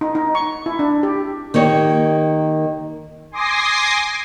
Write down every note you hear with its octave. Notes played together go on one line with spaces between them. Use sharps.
D#4
D#4
C#6
E4
D4
G4
D#3 A#3 G4 C#5
G#5 C6 D6 D#6 A#6 C7